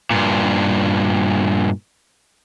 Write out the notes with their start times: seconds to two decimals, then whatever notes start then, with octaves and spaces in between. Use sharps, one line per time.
0.11 G2 A#2